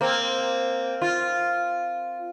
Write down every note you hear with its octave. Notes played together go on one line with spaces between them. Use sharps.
A#3 C4
F4